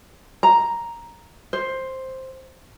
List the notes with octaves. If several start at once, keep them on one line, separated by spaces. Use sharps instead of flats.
A#5
C5